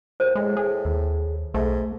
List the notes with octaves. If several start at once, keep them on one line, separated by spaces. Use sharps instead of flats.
D#2 C5
A2 G#3
G#4
D#2
B1 G#2 A3